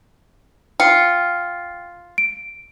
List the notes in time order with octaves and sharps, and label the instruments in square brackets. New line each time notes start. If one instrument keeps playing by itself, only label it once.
[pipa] F4 [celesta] G5 C#7
[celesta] D7